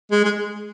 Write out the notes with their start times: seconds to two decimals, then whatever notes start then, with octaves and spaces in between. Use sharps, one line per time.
0.11 G#3
0.24 G#3